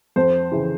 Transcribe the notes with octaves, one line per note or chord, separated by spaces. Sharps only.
F2 C5
C#3 E3